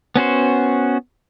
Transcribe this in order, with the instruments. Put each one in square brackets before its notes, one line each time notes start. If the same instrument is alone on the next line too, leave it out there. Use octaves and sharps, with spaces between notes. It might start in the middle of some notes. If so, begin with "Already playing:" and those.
[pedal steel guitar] B3 C#4 F#4 C5